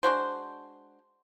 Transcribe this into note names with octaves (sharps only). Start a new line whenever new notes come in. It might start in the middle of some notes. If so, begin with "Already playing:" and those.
G#3 D4 F#4 C5